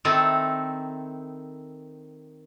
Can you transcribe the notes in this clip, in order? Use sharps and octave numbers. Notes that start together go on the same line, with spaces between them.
D#3 C4 D#4 E4 A4